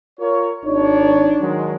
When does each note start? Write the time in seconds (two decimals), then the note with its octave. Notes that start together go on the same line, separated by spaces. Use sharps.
0.20 F4 A#4 C#5
0.65 G#1 D4 D#4 C#5
1.40 D#3 F#3 G#3